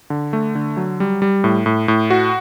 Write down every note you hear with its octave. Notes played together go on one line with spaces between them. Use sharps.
D3
A3
D3
F#3
G3
G3
A2
A2
A2
F#4